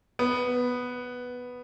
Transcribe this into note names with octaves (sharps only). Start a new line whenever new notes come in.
B3